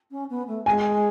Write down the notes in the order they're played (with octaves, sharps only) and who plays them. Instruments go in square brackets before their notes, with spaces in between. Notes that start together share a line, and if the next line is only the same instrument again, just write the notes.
[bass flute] C#4
B3
A3
[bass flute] G#3 [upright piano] G#5